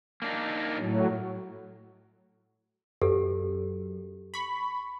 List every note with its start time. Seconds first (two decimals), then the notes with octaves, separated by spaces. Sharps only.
0.22 A#3 D4 D#4
0.78 A2 F#3
3.02 F#2 G4 A4 B4
4.34 B5 C#6